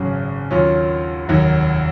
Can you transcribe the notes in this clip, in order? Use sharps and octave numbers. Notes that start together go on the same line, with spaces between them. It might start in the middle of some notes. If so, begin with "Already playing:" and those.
Already playing: G#1 F#2 C#3 F#3
D#2 D#3 F#3 C#4 F4
F1 D#2 D#3 F#3